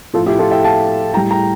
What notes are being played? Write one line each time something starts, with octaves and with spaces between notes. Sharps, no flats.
A2 F3 F4 A4
E4 G4
F4 A4
E5 G5
F5 A5
A2 G3 G5 A#5
G5 A#5